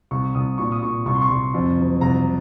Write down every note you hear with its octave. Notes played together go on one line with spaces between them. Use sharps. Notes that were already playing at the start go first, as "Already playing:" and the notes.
C2 C#6
C2 D#6
A#2 C#6
D#6
A#2 C#6
C2 C#6
C6
C#6
C2
F2
F#1
C2 A#5